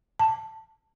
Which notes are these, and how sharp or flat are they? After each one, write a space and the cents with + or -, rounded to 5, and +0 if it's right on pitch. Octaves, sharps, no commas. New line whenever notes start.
A5 +5